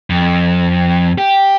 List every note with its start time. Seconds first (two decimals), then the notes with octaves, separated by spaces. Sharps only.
0.10 F2
1.18 G4